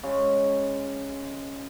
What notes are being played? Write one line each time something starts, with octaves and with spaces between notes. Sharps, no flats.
C#3 G#3